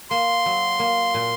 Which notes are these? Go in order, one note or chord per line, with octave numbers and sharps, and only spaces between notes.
A#3 C6
F#3
A#3
A#2